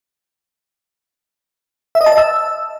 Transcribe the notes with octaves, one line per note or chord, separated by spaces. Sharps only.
E5
D#5
A5
D#5
E6